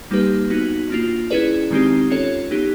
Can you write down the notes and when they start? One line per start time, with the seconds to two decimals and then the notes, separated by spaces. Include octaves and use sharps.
0.11 G3 A#3 D#4 G4 B4
0.50 B3 D#4 F#4
0.90 A#3 D4 F4
1.30 C#4 E4 G#4 B4 D5
1.71 D#3 G#3 C4 D#4 G4
2.10 C#4 F4 A4 C#5
2.51 B3 D#4 G4